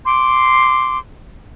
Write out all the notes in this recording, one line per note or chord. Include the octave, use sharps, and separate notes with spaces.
C6 D6